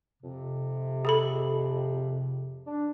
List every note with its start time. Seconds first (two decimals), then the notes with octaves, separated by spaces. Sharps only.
0.22 F2 C3
1.05 G#4 A4 B5
2.67 D4